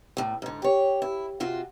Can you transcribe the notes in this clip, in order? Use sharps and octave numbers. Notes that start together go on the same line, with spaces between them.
E2 A2
G#2 D3
G4 C#5
E4
C3 F4 F#4